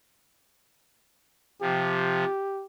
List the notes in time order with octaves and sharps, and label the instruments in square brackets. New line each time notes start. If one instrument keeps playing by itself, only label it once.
[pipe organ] C3 F3 [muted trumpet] G4